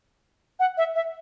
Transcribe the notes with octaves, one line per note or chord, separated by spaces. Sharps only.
F#5
E5
E5